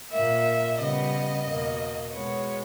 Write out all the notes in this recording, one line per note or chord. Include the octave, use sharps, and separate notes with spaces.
A#2 A#3 E5
C#3 G3 B3 D#5
E2 B2 A#3
B2 G#3 B3 C#5